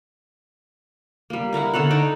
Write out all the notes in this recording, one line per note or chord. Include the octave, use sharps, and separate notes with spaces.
G3 A#3
E4 A#4 F5 F#5
D3 A4 C#5 F#5
D#4 D6